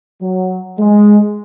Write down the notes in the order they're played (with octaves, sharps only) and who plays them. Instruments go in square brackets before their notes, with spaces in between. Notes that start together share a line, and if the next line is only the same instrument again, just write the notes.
[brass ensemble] F#3
G#3